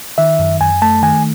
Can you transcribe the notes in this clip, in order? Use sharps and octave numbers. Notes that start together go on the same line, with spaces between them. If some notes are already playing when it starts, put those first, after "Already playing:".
D#3 E5
F#2
F#2 G#5
A3 A5
D#3 G#5